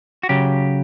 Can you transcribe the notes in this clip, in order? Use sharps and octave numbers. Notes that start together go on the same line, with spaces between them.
F#4
C#3 F#3 G4